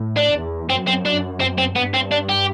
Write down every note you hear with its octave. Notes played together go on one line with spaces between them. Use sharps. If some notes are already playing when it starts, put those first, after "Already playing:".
Already playing: A2
D4
E2
F#2 C4
C4
D4
C4
C4
G2 B3
C4
D4
G4